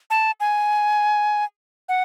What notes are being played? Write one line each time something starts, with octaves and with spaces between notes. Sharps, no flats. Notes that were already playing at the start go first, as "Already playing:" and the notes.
A5
G#5
F#5